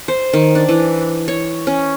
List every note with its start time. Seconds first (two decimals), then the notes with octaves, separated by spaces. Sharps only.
0.08 C5
0.33 D#3
0.55 D4
0.69 E3
1.28 C#5
1.67 C#4